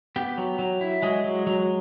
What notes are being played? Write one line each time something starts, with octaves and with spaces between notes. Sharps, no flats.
B3 G4
F#3
F#3
E4
F#3 G#3 G#4
F#3
F#3